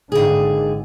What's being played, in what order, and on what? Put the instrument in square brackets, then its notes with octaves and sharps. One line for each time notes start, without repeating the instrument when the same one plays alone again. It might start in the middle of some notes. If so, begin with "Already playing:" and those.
[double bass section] G#1 D3 [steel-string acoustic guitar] D#2 G#4